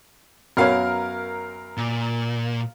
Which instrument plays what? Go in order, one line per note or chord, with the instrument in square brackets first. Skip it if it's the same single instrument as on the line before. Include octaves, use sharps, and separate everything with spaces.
[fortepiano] F#2 B3 C#5 [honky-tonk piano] A#4 F5
[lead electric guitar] A#2